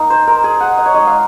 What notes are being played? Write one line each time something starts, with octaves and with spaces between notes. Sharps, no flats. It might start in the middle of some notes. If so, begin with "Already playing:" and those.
Already playing: A#3 D#4 D#5
C5
A#4
G#4
F#5
D#5
C#5
G#3 D#4 D#5
F5